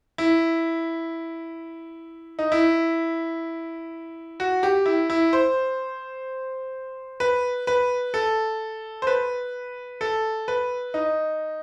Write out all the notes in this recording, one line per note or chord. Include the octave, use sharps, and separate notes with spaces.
E4
D#4
E4
F#4
G4
E4
E4
C5
B4
B4
A4
C5
B4
A4
B4
D#4